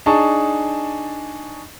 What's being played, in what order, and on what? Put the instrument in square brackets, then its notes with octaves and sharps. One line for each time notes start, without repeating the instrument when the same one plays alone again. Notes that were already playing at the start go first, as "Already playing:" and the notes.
[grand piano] D4 D#4 G#4 A5 C#6